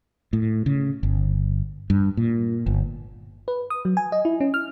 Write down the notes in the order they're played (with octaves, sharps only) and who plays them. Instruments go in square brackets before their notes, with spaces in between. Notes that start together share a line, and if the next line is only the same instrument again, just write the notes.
[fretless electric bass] A2
C#3
G1
G2
A#2
G1
[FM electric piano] B4
D#6
F#3
G#5
D#5
E4
C#4
F6